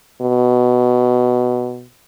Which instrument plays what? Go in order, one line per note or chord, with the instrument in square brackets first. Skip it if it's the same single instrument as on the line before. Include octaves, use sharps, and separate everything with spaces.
[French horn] B2